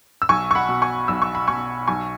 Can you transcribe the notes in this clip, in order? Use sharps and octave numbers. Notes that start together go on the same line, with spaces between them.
E6
B1 G#5 C#6
C#6
F#5 B5
B2
G#5 C#6
B1 E6
C#6
B5
B2 G#5 C#6
B1 G#5 C#6